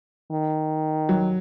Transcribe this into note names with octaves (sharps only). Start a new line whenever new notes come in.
D#3
F#3